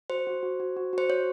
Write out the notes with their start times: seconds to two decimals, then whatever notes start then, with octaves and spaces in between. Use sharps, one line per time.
0.10 F#4 C5
0.27 F#4
0.43 F#4
0.60 F#4
0.77 F#4
0.93 F#4 C5
1.09 F#4 C#5